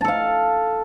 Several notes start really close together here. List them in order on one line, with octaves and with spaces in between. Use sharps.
A5 A4 F5